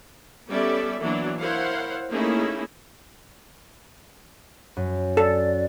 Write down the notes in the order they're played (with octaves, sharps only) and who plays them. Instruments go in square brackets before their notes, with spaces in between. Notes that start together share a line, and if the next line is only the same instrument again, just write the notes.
[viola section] G3 B3 C#4 A4 D5 E5
E3 F#3 A#3 B3 D4 E4
E4 A#4 C5 C#5 F5 F#5
A3 A#3 C#4 D#4 E4 G#4
[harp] F#2
[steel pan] A4 [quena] D5